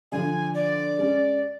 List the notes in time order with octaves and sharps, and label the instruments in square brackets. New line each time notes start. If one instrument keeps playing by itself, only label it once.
[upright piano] D3 F3 D4 [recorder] G#5
[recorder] D5
[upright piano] G#3 C#4